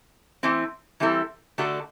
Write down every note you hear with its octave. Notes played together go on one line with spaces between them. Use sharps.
E3 A3 C4 E4
E3 G3 C4 E4 A4
D3 A3 D4 F#4 A4